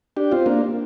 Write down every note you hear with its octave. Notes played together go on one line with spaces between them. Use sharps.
D4 G4
C4 F4
A#3 D4